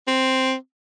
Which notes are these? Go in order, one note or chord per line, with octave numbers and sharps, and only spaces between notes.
C4